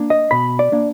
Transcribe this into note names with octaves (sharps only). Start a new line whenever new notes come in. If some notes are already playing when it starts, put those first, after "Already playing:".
Already playing: A#3 D4
D#5
B2 B5
D5
A#3 D4